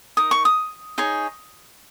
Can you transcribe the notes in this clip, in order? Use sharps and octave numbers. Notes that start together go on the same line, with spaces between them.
D#4 A#4 D#6
C#6
D#6
D#4 G#4 C#5